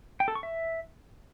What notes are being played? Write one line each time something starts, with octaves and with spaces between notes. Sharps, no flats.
G5
A4
C#6
E5